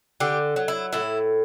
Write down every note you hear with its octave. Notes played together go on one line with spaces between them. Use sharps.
D3 G4
F#3
E4
A2 E4